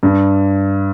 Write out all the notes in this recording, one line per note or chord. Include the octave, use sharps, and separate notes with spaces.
G2